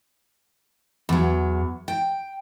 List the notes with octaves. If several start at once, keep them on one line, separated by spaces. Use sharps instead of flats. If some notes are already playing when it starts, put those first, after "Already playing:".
E2 F#3
G5